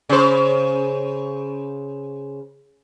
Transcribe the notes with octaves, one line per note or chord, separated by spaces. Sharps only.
C#3 C5